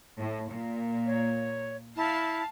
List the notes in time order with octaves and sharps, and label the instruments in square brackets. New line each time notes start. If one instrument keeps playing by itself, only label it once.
[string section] A2
A#2
[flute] C#5
[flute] E4 [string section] F5 A5